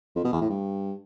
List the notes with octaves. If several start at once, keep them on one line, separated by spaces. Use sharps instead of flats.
F2
B2
E2
A2
G2